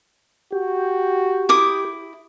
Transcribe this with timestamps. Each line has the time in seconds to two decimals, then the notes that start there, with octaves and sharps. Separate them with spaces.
0.52 F#4 G4
1.49 E4 D6 D#6